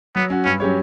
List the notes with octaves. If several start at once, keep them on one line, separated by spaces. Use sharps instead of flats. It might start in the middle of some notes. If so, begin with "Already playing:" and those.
F#3 B3
C#4 F#4
G2 C#4
F#3 C#4 G4 C#5